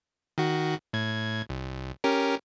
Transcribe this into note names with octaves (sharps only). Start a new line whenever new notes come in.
D#3 F#4
A2 G#6
C2
C#4 G4 A#4